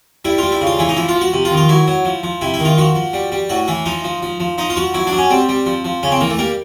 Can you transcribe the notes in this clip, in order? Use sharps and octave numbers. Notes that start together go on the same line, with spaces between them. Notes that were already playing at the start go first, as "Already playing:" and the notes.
G3 E4
G3 F4
E4
C#3
F4
E3 E4
D#4
F3 E4
F4
F3
F#4
C3
F4
D#3
F4
F#3 E4
F#3
F3
F3
C3 E4
E4
D#3
F4
F3 F#4
F3
G3
G3
A2 F#4
E3 E4
F3 D#4
F3
F3
F3
F3 D#4
F4
F3 F#4
F#3 E4
D4
F#3
C#4
G3 C4
G3
F3
F3
C#3 C#4
C4
E3 A#3
A3
G3 A#3